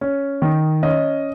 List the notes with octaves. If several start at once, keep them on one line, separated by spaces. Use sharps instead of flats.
C#4
D#3
C#4 D#5